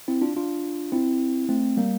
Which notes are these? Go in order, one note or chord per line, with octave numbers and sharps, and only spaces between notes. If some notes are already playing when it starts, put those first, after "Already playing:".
C4 E4
D4 F4
D4 F4
C4 E4
A3 C4
G3 A#3